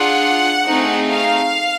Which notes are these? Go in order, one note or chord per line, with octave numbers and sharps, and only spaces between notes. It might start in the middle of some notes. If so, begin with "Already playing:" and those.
Already playing: D4 F4 G#4 F#5
A3 C4 D#4 G#4
F5